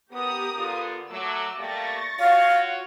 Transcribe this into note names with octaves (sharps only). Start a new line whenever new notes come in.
B3 G4 A#4 D#6
D3 B3 F4
F#3 A3 D6 E6
G3 A3 A#3 C#6 A6 A#6
F4 F#4 C#5 F5